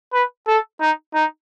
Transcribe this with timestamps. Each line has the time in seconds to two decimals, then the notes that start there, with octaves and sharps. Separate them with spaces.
0.13 B4
0.48 A4
0.81 D#4
1.14 D#4